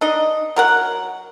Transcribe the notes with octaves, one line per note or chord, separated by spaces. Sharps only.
D4 D#4 D#5
F#3 A#4 F#5